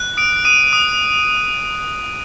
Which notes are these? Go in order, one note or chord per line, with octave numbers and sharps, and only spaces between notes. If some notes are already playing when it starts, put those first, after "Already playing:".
Already playing: F#6
D#6 D7
D#6 D#7
D#6